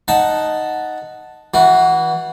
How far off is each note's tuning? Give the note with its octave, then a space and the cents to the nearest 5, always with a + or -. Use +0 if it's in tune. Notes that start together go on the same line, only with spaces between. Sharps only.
D#4 +0 F#5 +0 A5 +0
E3 -25 F#4 +0